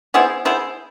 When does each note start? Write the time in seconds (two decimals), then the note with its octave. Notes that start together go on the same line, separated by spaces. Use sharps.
0.14 B3 E4 G#4 C5
0.45 B3 E4 G#4 C5